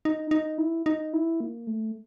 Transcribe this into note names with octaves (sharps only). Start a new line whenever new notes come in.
D#4
D#4
E4
D#4
E4
A#3
A3